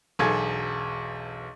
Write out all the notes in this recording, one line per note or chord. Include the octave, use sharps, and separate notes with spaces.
E1 B1 G#4 A4 G#6